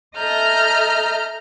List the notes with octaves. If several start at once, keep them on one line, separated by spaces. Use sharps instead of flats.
A4 D#5 E5 A#5 F6 G6